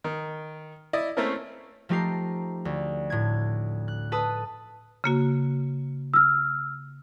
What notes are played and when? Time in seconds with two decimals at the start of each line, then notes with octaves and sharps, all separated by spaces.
0.04 D#3
0.93 E4 D5 D#5
1.17 A3 A#3 C4 C#4 E4 A#4
1.89 F3 A3 D#4 G4 A#5 C7
2.65 D2
3.10 A2 G#6
3.88 F#6
4.12 A4 B4 A5 D#6
5.04 C#3 A#3 F#4
6.14 E6 F6